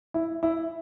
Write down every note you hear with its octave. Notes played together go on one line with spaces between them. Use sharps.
E4
E4